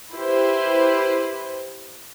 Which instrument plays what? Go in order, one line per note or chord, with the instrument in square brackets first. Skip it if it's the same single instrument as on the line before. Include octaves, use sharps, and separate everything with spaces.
[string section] E4 G4 B4 C5